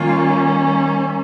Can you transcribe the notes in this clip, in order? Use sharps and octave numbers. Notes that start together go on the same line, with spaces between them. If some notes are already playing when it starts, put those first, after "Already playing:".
Already playing: D#3 G3 A#3 C#4 F4